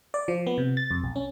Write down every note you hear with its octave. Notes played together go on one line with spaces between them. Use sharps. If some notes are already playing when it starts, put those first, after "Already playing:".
D5
F3
B3
C3
A6
F2
B1
C#4